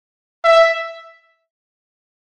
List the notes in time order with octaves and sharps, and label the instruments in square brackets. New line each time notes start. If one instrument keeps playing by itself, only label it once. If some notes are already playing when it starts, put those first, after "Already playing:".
[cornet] E5